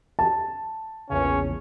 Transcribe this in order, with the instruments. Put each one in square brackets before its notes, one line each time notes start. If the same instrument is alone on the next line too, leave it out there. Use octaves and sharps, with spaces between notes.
[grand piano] A5
[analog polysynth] A#1 E2 C#3 [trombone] C#4